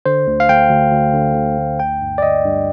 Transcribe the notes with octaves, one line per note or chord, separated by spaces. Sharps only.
D3 C5
D2
F5
D2 G5
D2
D2
D3
D2
D2
G1 G5
G2
D5
D3 D#5
G2